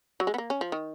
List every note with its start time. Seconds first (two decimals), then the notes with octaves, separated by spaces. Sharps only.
0.20 F#3
0.27 G#3
0.34 B3
0.38 A#3
0.50 C#4
0.61 F3
0.72 D#3